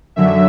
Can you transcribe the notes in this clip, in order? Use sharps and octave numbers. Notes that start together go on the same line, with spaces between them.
F#2 D3 F#3 E5